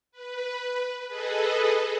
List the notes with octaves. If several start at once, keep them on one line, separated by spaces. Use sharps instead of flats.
B4
G#4 A4 B4 D#5